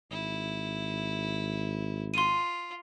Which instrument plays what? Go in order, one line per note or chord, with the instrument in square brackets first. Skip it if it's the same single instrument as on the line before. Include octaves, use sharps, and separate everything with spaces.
[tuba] G#1 [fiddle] E4
[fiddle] F4 [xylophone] C6 D#7